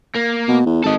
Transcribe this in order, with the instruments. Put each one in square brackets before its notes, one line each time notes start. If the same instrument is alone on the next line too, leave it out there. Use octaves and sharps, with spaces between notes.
[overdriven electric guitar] A#3
[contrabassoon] B2
E2
[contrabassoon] G#1 [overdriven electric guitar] A4 D#5